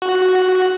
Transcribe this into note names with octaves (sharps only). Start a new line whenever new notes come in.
F#4